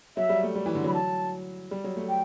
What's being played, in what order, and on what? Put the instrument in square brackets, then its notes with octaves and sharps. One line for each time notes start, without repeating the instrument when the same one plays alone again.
[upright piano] F#3 [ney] E5
[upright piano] G3
A3
G3
E3
D3
[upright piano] F#3 [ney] B5
[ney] A5
[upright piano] G3
F#3
A3
[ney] G5